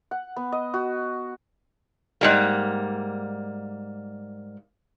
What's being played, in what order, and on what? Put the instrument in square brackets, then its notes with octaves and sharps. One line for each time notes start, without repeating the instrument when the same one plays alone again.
[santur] F#5
B3
D#5
F#4
[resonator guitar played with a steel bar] G#2 G3 A#3